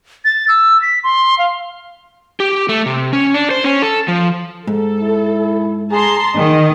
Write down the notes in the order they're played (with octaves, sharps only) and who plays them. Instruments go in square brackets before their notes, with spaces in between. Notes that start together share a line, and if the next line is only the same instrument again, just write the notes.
[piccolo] A6
E6
B6
C6
F5
[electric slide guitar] G4
A3
C3
C#4
D4
C5
C#4
A4
F3
[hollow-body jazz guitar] G#2 [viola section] A4
[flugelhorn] E4
[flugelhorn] G#4 [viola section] A5 A#5 C6
[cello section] D#3 [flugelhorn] G#4 [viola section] D#5